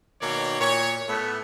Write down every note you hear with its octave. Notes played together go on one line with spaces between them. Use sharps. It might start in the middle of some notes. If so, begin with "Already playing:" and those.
B2 D#3 A#3 C#5 D5
A#2 C#5
A2 A3 B3